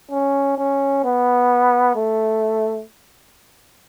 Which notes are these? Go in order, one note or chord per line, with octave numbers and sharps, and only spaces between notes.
C#4
C#4
B3
A3